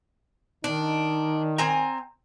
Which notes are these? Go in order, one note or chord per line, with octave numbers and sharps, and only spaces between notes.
D#3 D4 D#4
C4 G#5 A#5